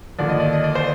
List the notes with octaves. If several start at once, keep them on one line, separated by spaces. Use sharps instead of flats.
D#2 D3 F3 D5
D#5
D5
D#5
D5
C5